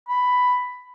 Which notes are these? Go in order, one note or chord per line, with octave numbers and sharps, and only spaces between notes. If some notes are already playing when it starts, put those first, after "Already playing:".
B5